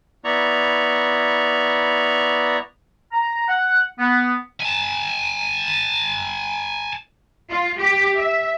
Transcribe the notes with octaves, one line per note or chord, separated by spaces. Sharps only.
B3 E4 D5 A#5 C#6
A#5
F#5
B3
G#5 A5
F4
G4
E5